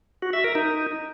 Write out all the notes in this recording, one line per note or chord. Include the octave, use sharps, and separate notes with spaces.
F#4
E5
A#4
D#4